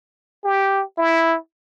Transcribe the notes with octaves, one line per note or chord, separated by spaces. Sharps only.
G4
E4